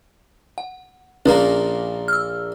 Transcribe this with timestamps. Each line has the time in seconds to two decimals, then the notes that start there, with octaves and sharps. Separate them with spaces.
0.58 F#5
1.26 A#1 A#2 A#3 C#4
2.08 E6 F6